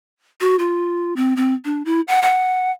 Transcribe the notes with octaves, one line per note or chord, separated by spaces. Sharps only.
F#4
F4
C4
C4
D4
E4
F#5
F#5